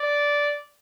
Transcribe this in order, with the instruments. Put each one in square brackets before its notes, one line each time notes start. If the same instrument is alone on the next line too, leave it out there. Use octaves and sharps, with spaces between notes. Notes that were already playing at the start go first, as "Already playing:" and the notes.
Already playing: [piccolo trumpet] D5